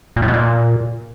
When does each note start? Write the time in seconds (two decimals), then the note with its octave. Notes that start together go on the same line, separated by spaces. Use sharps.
0.16 A#2
0.22 A2
0.28 B2
0.34 A#2